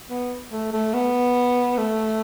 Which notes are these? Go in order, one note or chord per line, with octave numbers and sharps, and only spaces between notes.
B3
A3
A3
B3
A3